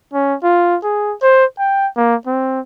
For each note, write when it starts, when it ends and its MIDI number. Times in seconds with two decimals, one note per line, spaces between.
0.14 0.35 61
0.43 0.77 65
0.84 1.14 68
1.22 1.45 72
1.59 1.88 79
1.97 2.15 58
2.27 2.60 60